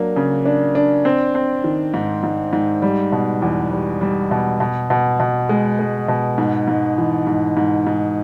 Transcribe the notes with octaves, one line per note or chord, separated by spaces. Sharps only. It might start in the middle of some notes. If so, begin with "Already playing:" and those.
Already playing: F#3 A#3 D4
C#3
D4
D4
C4
C4
D#3
G#2
G#2
G#2
G3
B2
E2
G3
G3
B2
B2
B2
B2
G#3
G#3
B2
G#2
G#2
E3
G#2
G#2
G#2